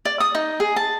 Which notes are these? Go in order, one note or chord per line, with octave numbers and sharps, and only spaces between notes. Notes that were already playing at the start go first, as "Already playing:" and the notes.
D5
D#6
D#4
G#4
A5